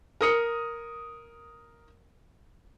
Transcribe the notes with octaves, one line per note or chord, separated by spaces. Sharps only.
A#4 D#6 C#7